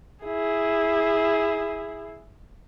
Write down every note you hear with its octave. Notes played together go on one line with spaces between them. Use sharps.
E4 G#4